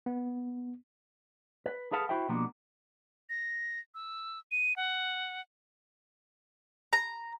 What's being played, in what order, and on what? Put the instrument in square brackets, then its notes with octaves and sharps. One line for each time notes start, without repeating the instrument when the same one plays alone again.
[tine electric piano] B3
[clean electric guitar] B4
G#4 A4 B4 F5 F#5 A5
E4 F#4 C5 E5 G5
B2 F3 G3 A#3 D4 F#4
[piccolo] A#6
E6
D#7
F#5
[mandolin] A#5